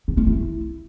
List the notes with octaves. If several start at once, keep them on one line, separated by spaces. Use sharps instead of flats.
D#4
C#4
E4